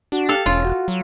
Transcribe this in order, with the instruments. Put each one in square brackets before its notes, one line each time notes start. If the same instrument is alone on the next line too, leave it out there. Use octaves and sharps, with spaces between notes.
[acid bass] D4 [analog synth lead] F#4
[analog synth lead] G4 [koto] A4 F5
[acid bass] E1 [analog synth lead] C#4 [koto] F4
[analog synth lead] F#4
[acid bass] F#3